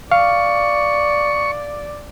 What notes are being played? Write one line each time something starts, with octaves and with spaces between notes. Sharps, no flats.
D5 F5 C#6